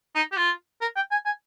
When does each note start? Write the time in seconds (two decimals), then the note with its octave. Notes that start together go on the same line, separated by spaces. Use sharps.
0.15 D#4
0.32 G4
0.37 F4
0.81 A#4
0.96 G5
1.11 G#5
1.25 G#5